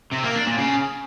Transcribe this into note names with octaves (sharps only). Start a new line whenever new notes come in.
C3
A#3
D4
A#2
C#3